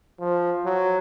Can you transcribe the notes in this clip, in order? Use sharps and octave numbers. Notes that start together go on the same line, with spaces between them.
F3
F#3